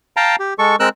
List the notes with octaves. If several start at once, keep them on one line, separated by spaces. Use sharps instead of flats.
F5 G5 A5 A#5
G4
G#3 A4 C#6
G#3 C4 A#4 E6 F#6